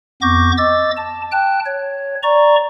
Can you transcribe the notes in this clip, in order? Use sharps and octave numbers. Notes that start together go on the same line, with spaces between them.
F2 B3 C#6 D6 G6 A#6
D#5 D6 E6 A6
A5
G5 A5 F#6
C#5
D5 A#5 C#6